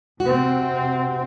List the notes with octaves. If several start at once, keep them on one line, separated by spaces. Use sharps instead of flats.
C3 C4 F#4